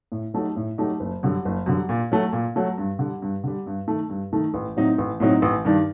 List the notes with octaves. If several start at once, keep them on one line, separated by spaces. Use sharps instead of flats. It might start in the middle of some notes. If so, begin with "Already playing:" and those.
A2
F#3 A3 D#4 G4
A2
F#3 A3 D#4 G4
F#1
F#2 D3 G3
F#1
F#2 D3 G3
A#2
F#3 A3
A#2
F#3 A3
G2
D3 G3
G2
D3 G3
G2
D#3 A3
G2
D#3 A3
A1
A2 F#3 C4 D#4
A1
A2 F#3 C4 D#4
A1
G2 D#3 G3 D4